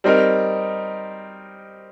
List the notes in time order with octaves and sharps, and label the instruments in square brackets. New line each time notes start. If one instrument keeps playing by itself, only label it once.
[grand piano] G3 C4 D#4 A#4